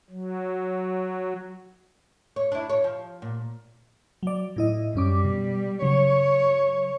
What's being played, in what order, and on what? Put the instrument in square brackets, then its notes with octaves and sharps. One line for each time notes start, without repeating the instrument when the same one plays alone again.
[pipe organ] F#3
[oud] C#5
D4 E4
C#5
F3
A#2
[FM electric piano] F#3 D5
A2 E4 D#5
[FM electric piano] F#2 C#4 D6 [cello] G3
[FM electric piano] B2
[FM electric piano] C#3 F#3 [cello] C#5